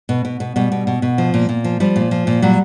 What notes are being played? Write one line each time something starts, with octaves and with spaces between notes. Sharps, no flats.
B2
B2
B2
B2 G3
B2
B2
B2
F3
A#2
A#2
F3
F3 G3
A#2
F3
A#2
F#3 G3